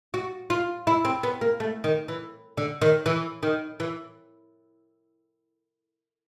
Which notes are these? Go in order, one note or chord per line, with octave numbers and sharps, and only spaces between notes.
F#4
F4
E4
C4
B3
A#3
A3
D#3
E3
D3
D#3
E3
D#3
E3